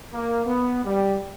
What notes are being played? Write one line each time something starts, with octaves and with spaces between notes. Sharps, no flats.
A#3
B3
G3